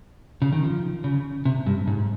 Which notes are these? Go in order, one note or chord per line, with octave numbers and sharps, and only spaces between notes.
C#3
D#3
F3
C#3
C3
G2
G#2